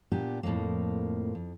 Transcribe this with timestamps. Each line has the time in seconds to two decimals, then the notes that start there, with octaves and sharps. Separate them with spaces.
0.12 A#2 B3 D4 G4
0.43 F2 A2 D3 F3 A#3
1.35 F2